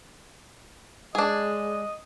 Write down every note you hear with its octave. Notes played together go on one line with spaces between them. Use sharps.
G#3 D4 G#4 D#5